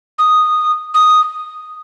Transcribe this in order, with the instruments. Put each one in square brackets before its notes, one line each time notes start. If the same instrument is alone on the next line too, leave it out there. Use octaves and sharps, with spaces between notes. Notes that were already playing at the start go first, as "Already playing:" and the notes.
[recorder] D#6
D#6